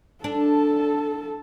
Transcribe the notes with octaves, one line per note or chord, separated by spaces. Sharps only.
D4 A4 A5